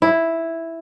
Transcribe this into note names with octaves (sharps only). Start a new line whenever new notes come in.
E4